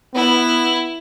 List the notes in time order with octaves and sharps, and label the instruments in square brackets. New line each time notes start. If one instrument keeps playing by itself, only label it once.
[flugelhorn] B3 [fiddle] E4